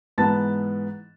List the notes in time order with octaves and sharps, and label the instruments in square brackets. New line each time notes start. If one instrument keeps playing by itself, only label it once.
[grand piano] G#2 E3 B3 A5 A6